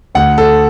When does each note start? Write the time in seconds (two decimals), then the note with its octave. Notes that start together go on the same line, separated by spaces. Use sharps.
0.15 D2 F#5
0.38 A4